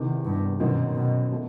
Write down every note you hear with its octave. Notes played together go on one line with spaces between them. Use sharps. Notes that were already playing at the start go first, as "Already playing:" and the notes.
Already playing: E2 C3 D#3
G2
F#2 B2 D#3 F#3 C4 D#4
B2
B2 A3